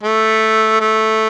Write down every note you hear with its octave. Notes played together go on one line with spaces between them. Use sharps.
A3
A3